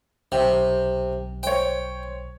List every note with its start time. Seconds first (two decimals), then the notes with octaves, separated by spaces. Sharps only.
0.32 B1 C3 G5
1.43 C5 C#5 G5